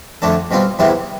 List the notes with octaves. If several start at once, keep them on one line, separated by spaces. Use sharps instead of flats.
F2 D3 A3 D4 A4
B2 G3 C4 F4
E2 C3 G3 B3 E4